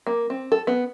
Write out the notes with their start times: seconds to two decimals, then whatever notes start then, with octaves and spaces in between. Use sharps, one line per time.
0.07 A#3
0.30 C4
0.52 A4
0.67 B3